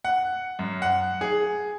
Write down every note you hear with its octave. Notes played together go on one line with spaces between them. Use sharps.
F#5
F#2
F#5
G#4